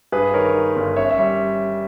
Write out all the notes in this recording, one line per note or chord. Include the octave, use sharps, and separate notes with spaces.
G2 G#4 B4
D#3 A#4 C#5
D#3
G1
C#4 C#5 E5
C#5 E5
G3